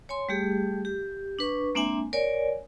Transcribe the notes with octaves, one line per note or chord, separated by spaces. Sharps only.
C#5 G#5 C6
G3 A3 G4 G#4
G4
D4 B4 C#6
G#3 A#3 C4 D4 E5 G#5
A#4 C#5 D5 G#5